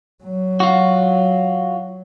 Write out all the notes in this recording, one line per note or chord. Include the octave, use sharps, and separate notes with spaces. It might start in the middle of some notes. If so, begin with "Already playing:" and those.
F#3
F4 F#4